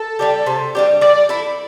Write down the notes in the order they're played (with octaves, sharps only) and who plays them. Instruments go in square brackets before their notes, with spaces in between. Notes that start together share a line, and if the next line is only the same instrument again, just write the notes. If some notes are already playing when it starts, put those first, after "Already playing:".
Already playing: [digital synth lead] A4
[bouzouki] G3 D4 G4
C3
G3 D4 G4
[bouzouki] G3 [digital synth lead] D5
[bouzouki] E4 A4